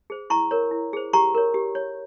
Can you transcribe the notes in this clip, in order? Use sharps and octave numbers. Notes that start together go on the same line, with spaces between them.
G#4 C5
E4 A#5 C#6
A#4 C#5
E4
G#4 C5
G4 A#5 C#6
A#4 C#5
G4
C#5